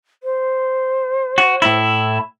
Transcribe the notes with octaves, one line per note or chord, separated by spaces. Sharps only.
C5
F#4
A2 E4